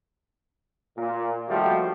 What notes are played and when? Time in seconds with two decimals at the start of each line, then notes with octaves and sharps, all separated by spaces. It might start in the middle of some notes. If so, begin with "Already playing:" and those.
0.98 A#2
1.49 D#3 F3 G3 A3 F#4 G4